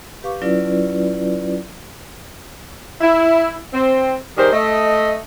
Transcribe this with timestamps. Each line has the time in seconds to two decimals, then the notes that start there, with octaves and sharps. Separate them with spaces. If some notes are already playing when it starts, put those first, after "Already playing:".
0.23 G4 B4 F5 C#6 D6
0.42 F#3 C#4 E4 F4 B4 D5
3.01 E4
3.74 C4
4.37 D#3 G3 G#4 A#4 C5
4.53 A3 D#5